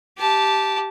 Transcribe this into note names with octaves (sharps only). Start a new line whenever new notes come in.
G4 A5